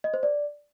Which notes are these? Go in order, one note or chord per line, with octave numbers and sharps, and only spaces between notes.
D#5
C5
D5